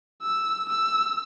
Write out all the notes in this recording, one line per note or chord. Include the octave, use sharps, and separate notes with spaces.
E6
E6